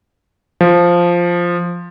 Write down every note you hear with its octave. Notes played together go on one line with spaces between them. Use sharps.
F3